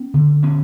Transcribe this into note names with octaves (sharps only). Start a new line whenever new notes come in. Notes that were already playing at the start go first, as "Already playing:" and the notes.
Already playing: B3 C#4
D3
D3 B3 C#4